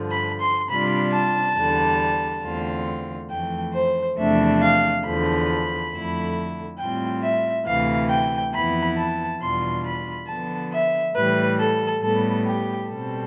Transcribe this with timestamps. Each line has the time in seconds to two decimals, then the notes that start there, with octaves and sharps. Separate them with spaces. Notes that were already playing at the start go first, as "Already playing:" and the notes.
Already playing: G2 D3 F3
0.11 B5
0.41 C6
0.69 C3 G3 D4 F4 B5
1.12 A5
1.56 E2 D3 G3
2.43 E2 D3 A3 C4 F4
3.31 F2 E3 A3 G5
3.74 C5
4.17 E2 C3 F3 A3 D4 E5
4.62 F5
5.05 E2 D3 F3 B5
5.92 F2 D3 A3 E4
6.79 A2 G3 C4 F4 G5
7.23 E5
7.66 D2 C3 E3 F5
8.10 G5
8.54 F2 E3 B3 E4 B5
8.97 A5
9.41 E2 B2 G3 D4 F4 C6
9.85 B5
10.28 D3 F3 B3 A5
10.72 E5
11.15 A2 E3 G3 B4
11.60 A4
12.03 A2 G3 B3 A4
12.46 G4
12.89 B2 G3 C4 A4